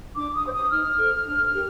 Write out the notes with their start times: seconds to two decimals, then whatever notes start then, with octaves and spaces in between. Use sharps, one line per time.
0.15 D4 D6
0.34 D#6
0.43 G4 C5
0.52 D#6
0.70 D#4 F6
0.98 A4 C5
1.25 D4
1.54 G4 A#4